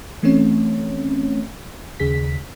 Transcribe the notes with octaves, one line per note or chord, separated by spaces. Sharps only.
E3 A3 C4 C#4 C#5
D#2 C#3 G#4 B6